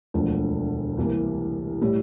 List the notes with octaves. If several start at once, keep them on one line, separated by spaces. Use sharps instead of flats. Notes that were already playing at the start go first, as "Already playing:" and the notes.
E1 D2 D3 F3
C2 C3 E3 A#3
A2 G3